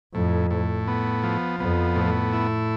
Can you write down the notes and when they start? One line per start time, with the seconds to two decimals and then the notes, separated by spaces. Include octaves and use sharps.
0.14 F2 A2
0.51 A2
0.88 B3
1.23 F3
1.60 F2 B3
1.96 A2
2.33 E4